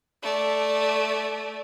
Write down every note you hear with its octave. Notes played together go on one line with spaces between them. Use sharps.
A3 D5